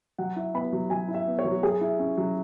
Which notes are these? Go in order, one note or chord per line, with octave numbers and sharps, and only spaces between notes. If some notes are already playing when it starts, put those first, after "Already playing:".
F#3 F#5
E4
B3 B5
F#3
F#3 G#5
E4
E5
B3
C#5
F#3
F#4
F#3 G#4
E4
C#4
F#3